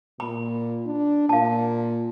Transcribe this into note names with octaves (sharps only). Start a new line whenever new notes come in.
A#2 B5
D4
A#2 F5 A5